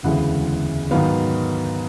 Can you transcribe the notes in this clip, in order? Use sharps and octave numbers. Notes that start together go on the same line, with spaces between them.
E1 D2 C#3 E3 G#3 F#5
G#2 D#3 F#3 B3 F5